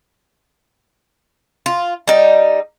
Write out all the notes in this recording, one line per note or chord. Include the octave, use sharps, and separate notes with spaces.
F4
G3 D#4